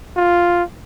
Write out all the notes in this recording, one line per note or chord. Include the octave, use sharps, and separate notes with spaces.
F4